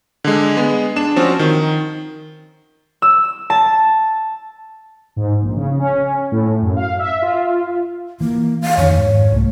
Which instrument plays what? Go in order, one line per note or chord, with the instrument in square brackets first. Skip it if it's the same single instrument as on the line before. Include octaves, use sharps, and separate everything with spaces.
[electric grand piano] D3 G#3
G#3 B3
D4 E7
F3 C4 C#4 F#4
D#3
[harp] E6
A5
[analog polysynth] G#2
A#1
C#3
C#4
A2
F#2
F5
E5
F4
[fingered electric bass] E3 [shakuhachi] A#3
[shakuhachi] F5
[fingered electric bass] F2 D#3 [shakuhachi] C#5
[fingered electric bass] G#2
C2 A3